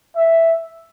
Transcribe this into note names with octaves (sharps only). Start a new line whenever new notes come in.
E5